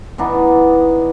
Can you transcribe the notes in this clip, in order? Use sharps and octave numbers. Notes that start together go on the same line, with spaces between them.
E3 B3 D4 D#4